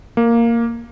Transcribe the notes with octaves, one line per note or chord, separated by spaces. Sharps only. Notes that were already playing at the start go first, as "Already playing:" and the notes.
A#3